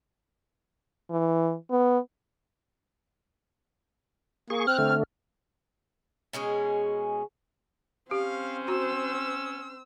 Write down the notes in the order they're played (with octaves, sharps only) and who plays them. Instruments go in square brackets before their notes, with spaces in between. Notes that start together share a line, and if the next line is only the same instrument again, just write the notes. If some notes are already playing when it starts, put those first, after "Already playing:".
[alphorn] E3
B3
[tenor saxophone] A#3 [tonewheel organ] G#4 C#6
[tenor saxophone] C4 [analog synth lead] F6 [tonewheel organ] F#6
[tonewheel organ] D3 A3
[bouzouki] B2 G#3 C#4 G#4
[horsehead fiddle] C4 C5 [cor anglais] C#4 [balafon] G4 [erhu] F5
[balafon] F#4 A#5 [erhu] E6